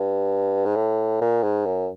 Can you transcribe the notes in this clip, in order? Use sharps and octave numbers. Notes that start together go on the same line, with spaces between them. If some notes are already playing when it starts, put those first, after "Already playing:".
Already playing: G2
G#2
A2
A#2
G#2
F#2